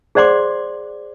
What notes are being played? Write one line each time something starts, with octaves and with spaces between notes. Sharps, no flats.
G#4 C5 D5 F#5 C6 D6